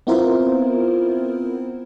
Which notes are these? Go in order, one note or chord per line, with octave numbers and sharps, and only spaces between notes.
B3 C4 E4 F4 A#4 C5